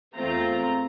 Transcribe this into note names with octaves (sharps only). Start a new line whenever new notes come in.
E2 A3 C4 F4 A#5